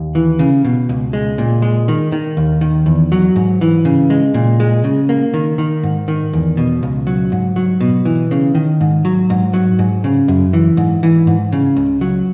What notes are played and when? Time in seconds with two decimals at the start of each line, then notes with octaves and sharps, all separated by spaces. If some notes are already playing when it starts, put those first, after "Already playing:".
Already playing: D#2
0.15 E3
0.39 C#3
0.65 B2
0.89 C#2
1.13 G#3
1.38 A#2
1.62 G#3
1.88 D#3
2.12 D#3
2.37 D#2
2.61 D#3
2.86 E2
3.12 F#3
3.36 G#2
3.61 E3
3.85 C#3
4.10 G#3
4.34 A#2
4.60 G#3
4.84 C#3
5.09 A#3
5.34 D#3
5.58 D#3
5.83 G#2
6.08 D#3
6.33 E2
6.57 B2
6.83 C#2
7.07 F#3
7.32 G#2
7.56 F#3
7.81 B2
8.05 E3
8.31 C#3
8.55 D#3
8.81 G#2
9.05 F#3
9.30 G#2
9.54 F#3
9.79 G#2
10.04 C#3
10.28 F#2
10.53 E3
10.77 G#2
11.03 E3
11.27 G#2
11.52 C#3
11.77 C#2
12.01 F#3